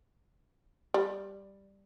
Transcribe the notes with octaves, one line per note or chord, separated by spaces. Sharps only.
G3